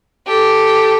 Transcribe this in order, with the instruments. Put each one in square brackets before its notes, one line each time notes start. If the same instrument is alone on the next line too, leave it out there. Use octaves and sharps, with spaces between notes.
[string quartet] G4 A4